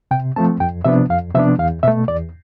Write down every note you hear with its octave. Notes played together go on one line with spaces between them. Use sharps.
C3 G5
F3 A3 C4 A5
F2 G5
C3 F3 B3 D4 E5
F2 F5
C3 F3 B3 D4 E5
E2 F5
B2 A3 E5
E2 D5